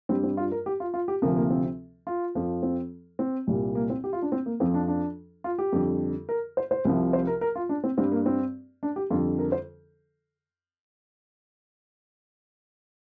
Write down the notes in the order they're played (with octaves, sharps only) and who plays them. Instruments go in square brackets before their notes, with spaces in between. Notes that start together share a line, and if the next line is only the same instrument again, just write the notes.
[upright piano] G2 G3 C4
C4
F4
A#4
G4
F4
F4
G4
D2 C3 F3 A#4
A#3
C4
F4
F2 F3
C4
C4
C2 A#2 G3
A#3
C4
G4
F4
D4
C4
A#3
F2 F3 C4
D4
D4
F4
G4
F2 D3 G3
A#4
C5
C5
C2 C3 F3
C5
A#4
A#4
F4
D4
C4
G2 G3 C4
A#3
C4
D4
G4
F2 D3 G3 F4
A#4
C5